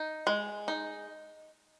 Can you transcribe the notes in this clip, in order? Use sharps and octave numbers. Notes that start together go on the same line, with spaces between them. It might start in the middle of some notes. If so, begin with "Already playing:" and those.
Already playing: D#4
G#3
D#4